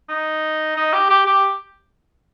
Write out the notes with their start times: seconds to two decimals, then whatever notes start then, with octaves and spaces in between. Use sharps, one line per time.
0.09 D#4
0.76 D#4
0.93 G4
1.10 G4
1.26 G4